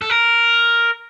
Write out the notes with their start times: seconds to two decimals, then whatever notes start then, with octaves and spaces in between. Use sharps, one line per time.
0.02 A4
0.10 A#4